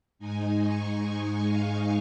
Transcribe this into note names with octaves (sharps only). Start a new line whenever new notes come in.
G#2 G#3 D#4 G#5
C#6
G#5
F5